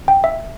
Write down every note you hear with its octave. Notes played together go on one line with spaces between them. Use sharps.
G5
E5